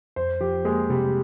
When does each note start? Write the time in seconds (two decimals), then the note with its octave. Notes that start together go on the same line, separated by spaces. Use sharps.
0.16 F2 C5
0.41 F3 G4
0.65 G#3 A#3
0.89 C3 G3